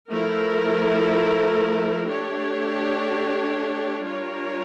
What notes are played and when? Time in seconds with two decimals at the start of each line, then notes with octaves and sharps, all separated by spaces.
0.11 F3 A3 E4 A#4
2.07 A3 D4 G4 C#5
4.04 G3 D4 F4 A#4 C#5